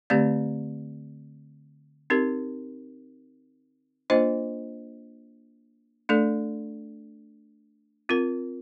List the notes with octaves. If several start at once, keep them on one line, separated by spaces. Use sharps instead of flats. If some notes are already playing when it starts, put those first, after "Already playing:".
D3 A3 C4 G4 D5
C4 D#4 G4 A#4
A#3 D4 F4 C5 D#5
A3 D4 A4 D5
C4 F4 A#4